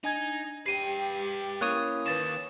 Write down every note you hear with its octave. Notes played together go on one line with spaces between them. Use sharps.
D4 D#4 G#5 G#6
G4 B4 G5 C7 D#7
A#3 C#4 E4 C#5 D#6 F#6
D#2 B4 A6 E7